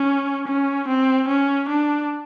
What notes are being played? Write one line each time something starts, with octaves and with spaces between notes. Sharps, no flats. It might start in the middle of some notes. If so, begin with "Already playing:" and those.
Already playing: C#4
C#4
C4
C#4
D4